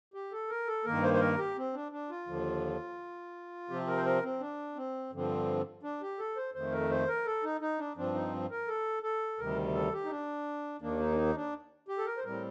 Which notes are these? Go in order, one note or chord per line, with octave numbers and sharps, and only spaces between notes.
G4
A4
A#4
A4
G2 D#3 A#3 A#4
C5
C5
A#4
G4
C4
D4
D4
F4
D#2 D3 F3
C3 F3 C4 G4
A#4
C5
A#4
C4
D4
C4
G2 D3 F3 C4
D4
G4
A4
C5
F2 D#3 A3 C5
A#4
C5
A#4
A4
D#4
D#4
D4
G2 F3 C4 D4
D#4
A#4
A4
A4
D2 C3 D#3 G3 A#4
A4
G4
D#4
D4
D#2 D#3 A#3 D4
D#4
D4
D#4
D4
G4
A4
A#4
C5
A2 G3 C4 A#4